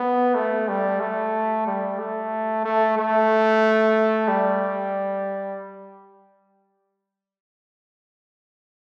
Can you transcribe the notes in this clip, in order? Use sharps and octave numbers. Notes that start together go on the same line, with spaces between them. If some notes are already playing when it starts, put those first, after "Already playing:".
Already playing: B3
A3
G3
A3
G3
A3
A3
A3
G3